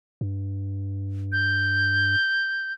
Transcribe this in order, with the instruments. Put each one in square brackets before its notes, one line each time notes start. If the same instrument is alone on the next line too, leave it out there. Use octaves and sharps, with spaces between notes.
[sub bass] G2
[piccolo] G6